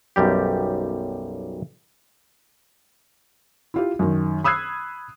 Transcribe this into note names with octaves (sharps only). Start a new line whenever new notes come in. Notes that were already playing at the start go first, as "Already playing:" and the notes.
B1 F#2 G3 G4
E4 F4 G4
F#2 D#3
B5 D#6 E6 F#6 G#6 C7